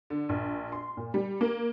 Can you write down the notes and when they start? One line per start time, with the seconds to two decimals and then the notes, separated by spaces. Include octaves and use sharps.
0.10 D3
0.29 A#1
0.72 C6
0.97 A#2
1.14 G3
1.41 A#3